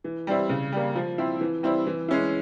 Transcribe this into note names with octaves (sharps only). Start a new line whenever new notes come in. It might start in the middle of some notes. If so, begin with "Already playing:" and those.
E3
G3 C4 E4
C#3
G3 A#3
F3
C4 E4
E3
G3 C4 E4
E3
G#3 C#4 E4